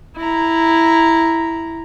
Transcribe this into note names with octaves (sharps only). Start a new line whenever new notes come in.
E4 A#5